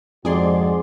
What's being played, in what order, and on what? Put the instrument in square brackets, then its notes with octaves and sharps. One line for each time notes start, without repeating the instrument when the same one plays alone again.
[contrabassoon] F2 [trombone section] G#2 G#3 F#4 [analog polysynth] G#4 D5 C6